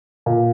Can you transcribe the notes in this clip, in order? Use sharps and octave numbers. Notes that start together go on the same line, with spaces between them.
A#2